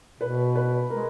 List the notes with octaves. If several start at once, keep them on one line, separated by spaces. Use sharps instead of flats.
B2 B4
B4
G#3 A#4